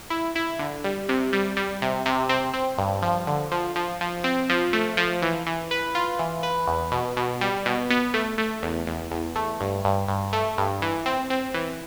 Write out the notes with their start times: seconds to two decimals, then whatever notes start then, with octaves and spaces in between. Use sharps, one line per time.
0.10 E4
0.36 E4
0.59 D3
0.84 G3
1.09 C3
1.33 G3
1.57 G3
1.82 C3
2.06 C3
2.29 C4
2.54 C4
2.78 G2
3.02 F3
3.27 D3
3.52 F3
3.76 F3
4.01 F3
4.24 C4
4.50 F3
4.73 A3
4.97 F3
5.22 E3
5.46 E3
5.71 B4
5.95 F4
6.19 E3
6.43 B4
6.67 E2
6.92 B2
7.17 B2
7.41 G3
7.66 B2
7.90 B3
8.14 A3
8.38 A3
8.63 E2
8.87 E2
9.11 E2
9.36 A3
9.61 G2
9.85 G2
10.08 G2
10.33 A3
10.58 G2
10.82 E3
11.06 C4
11.30 C4
11.54 E3